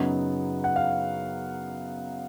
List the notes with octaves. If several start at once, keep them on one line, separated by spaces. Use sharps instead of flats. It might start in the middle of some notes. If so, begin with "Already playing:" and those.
Already playing: F#2 C#3 F#3 B3 D#4 F#5
F#5
F5